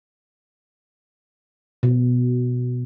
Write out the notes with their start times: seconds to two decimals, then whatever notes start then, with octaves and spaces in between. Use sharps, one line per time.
1.83 B2